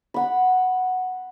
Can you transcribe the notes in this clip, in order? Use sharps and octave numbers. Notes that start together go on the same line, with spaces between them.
F#5 B5